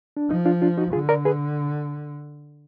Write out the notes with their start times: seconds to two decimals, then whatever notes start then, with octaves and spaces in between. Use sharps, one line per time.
0.17 D4
0.30 F3 D#4
0.45 D4 F4
0.62 D4 F4
0.78 D#4 F#4
0.93 D3 F4 G#4
1.09 A#4 D5
1.25 G#4 B4